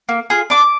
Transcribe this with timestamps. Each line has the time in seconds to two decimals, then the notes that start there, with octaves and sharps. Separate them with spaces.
0.09 A#3
0.30 F4 G#4
0.50 D4 D6